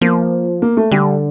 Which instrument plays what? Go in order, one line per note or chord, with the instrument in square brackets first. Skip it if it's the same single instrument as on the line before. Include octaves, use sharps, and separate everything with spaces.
[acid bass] F3 [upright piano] A#3
[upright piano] A#3
A3
[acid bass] D3 [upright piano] G3